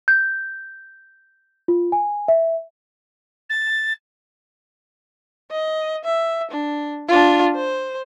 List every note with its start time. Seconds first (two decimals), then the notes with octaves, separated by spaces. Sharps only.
0.08 G6
1.68 F4
1.92 G#5
2.28 E5
3.49 A6
5.51 D#5
6.04 E5
6.51 D4
7.08 D4 F4
7.55 C5